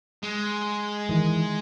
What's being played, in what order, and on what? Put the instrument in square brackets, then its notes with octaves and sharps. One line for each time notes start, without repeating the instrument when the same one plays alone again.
[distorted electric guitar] G#3
[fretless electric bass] D#3 E3